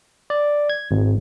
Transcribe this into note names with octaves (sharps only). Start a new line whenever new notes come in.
D5
G#6
G#1